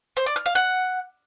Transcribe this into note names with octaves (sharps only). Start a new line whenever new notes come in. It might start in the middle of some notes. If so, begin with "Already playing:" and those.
C5
D5
F6
F5
F#5